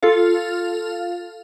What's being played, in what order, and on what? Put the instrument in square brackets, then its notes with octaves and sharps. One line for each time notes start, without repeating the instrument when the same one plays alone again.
[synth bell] F4 A4 F5